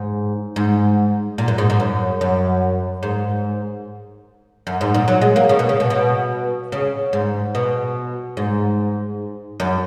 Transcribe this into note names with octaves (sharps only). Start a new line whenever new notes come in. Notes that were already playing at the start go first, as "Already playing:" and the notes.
Already playing: G#2
G#2
A#2
F#2
G#2
G#2
F#2
F#2
G#2
F#2
G#2
A#2
F#3
G#3
A#3
C#3
B2
C#3
B2
B2
C#3
G#2
B2
G#2
F#2